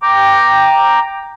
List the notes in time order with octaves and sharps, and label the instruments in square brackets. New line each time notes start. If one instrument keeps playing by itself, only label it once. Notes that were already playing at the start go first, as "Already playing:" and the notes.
[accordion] G5 A#5 D6